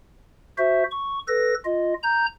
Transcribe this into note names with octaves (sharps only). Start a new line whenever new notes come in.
F#4 C5 E5
C#6
A4 B4 A#6
F4 D#5
A#5 G6